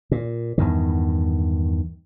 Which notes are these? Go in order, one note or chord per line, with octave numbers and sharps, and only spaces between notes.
A#2
E2 G2 D#3